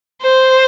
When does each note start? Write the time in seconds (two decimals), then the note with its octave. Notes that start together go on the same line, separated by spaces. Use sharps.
0.22 C5